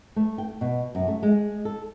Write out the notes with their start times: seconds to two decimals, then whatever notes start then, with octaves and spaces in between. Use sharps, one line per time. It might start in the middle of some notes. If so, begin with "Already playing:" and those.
0.16 A3
0.38 G5
0.61 B2
0.95 F#2
1.08 A3
1.23 G#3
1.65 A4